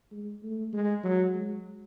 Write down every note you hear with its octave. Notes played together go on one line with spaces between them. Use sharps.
G#3
A3
G#3
F#3
G#3